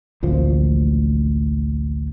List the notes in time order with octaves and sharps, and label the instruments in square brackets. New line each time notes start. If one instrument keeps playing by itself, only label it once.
[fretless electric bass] A1 D2 A#2 F3